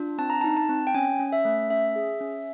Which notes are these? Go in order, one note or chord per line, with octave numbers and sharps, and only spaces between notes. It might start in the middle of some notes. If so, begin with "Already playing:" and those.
Already playing: D4 F4
C4 A5
A#5
D#4 A5
A5
C4
G5
C#4 G#5
C#4
E5
A3
C#4 E5
G#4
C#4